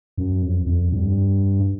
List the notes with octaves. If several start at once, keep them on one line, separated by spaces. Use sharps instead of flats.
F#2
F2
F2
G2